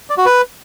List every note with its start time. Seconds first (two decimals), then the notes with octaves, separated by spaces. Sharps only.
0.10 D5
0.18 F#4
0.26 B4